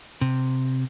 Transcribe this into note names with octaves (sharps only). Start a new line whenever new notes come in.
C3